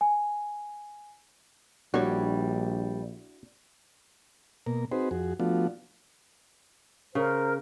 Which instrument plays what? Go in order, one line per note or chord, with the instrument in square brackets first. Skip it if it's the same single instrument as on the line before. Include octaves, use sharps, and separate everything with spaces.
[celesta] G#5
[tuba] A#1 [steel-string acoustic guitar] G3 [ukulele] D4 E4 C#5 [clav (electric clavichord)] F#4
[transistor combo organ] B2 A#3 A#4
C4 D#4 F#4 G#4 B4 C5
F2 F#4 G#4
F3 A3 B3 D4 F4 F#4
[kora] C#3 [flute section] A#4 C5